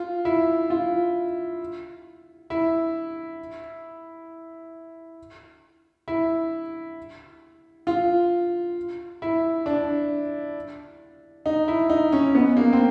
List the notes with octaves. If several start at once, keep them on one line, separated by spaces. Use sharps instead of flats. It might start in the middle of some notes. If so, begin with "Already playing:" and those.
Already playing: F4
E4
F4
E4
E4
F4
E4
D4
D#4
E4
D#4
C#4
B3
A#3
C4